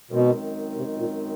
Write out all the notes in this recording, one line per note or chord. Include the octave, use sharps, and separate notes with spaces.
F#2 B2 D#3 G#3 C4 D#4
C3
A#2